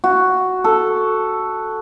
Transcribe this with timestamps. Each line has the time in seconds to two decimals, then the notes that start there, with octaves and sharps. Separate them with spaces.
0.04 F#4
0.64 A4